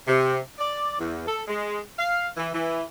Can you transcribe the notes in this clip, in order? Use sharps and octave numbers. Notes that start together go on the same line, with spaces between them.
C3
D5
E2
A4
G#3
F5
E3
E3